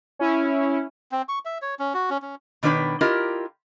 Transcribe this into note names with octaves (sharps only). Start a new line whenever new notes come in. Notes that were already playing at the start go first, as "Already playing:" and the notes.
C#4 E4
C4
C#6
E5
C#5
C#4
F#4
C#4
C#4
B2 D#3 D4 B4 C#5 G5
E4 F4 G4 A#4 D#5